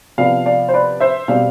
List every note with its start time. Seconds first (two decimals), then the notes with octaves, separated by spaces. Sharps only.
0.18 C3 F3 B3 D5 F5
0.46 D5 F5
0.69 C5
0.74 B4 D5
1.00 C5 E5
1.28 B2 G3 C4 D5 F5